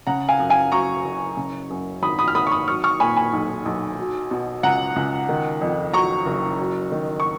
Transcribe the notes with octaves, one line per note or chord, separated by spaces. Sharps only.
C#3 F#5 A#5
F5 G#5
F#2
F5 G#5
F#3 A#5 C#6
F#1
C#3
F#2
G#1 B5 D#6
B5 D#6
F6
G#1 B5 D#6
C#6
B5 D#6
F#3 C#6 F6
C#6 F6
A#2 G#5 B5
G#5 B5
B1
B1
F#3
B2
C#2 F#5 A#5
C#2
D#3
F2
F#3 A#5 C#6
F#1
F#3
D#3
C#6